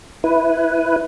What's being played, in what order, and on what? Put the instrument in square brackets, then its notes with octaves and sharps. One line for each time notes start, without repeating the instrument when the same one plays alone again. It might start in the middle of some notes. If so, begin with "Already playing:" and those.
[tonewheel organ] E4 B4